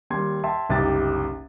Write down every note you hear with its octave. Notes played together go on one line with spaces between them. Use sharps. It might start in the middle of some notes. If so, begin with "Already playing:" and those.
D#2 G3 C6 G#6
E5 G5 A5 C6
F#1 C2 D#4 G4 A6